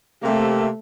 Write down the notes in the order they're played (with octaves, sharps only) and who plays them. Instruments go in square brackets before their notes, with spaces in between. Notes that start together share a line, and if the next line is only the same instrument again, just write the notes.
[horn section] C3 A#3 [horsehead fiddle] A3